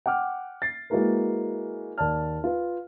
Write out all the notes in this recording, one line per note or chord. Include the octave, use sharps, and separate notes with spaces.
F#5 G5 D6 F6
A6 C7
G#3 A#3 E4 F#4 A#4 B4
D#2 D5 A5 F6
F4 B4